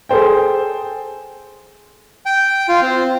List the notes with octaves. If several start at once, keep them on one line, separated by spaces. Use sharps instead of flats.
G#4 A4 C5 G5
G5
F4
C4